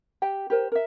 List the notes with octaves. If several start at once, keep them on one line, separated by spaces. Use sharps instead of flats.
G4 G5
G4 A#4 C5
A#4 E5